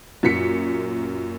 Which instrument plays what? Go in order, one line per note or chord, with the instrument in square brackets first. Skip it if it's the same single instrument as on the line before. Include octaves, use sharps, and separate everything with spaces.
[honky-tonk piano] F#2 A#2 B6 C#7